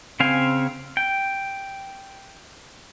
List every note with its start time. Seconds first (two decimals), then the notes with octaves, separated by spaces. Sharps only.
0.20 C#3 C4 F5 G#5
0.97 G5